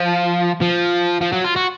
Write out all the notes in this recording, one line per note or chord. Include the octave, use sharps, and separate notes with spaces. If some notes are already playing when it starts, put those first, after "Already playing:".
Already playing: F3
F3
F3
F#3
F4
F#4